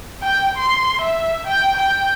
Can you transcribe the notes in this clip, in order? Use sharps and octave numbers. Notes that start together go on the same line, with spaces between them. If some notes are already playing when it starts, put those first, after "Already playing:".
G5
C6
E5
G5
G5